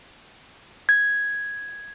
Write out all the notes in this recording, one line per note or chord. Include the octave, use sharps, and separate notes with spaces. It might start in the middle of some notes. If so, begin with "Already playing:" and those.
G#6